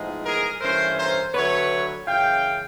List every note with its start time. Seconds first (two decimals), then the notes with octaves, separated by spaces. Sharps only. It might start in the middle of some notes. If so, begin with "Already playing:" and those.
Already playing: A2 F3 G#3 B3 D#4
0.24 G#4 A#4
0.61 G2 E3 A3 C#4 A#4 C5
0.97 A#4 C5
1.34 D3 F#3 A3 B4 C#5
2.07 F#2 C#3 E3 F5 G5